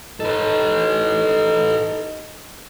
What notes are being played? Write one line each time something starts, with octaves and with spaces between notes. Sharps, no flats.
D#4 A4 B4